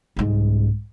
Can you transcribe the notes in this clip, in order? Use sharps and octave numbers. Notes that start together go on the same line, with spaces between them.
C2 G#2